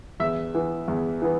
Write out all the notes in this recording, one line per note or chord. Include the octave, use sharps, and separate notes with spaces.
E2 E5
E3 B3
E2
E3 B3